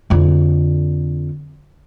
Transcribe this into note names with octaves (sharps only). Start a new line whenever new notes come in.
F2 D3